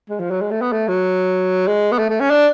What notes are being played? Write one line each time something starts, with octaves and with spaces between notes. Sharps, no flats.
G#3
F3
F#3
G#3
A3
B3
A3
F#3
G#3
B3
A3
A3
C#4
D4